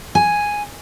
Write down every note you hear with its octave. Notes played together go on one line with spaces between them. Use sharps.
G#5